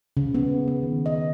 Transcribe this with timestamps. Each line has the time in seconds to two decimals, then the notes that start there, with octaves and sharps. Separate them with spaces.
0.17 C#3
0.35 B3
0.68 B3
0.83 D#3
1.06 D#5